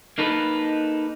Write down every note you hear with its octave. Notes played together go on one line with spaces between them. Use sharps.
A#3 D#4 A4 B4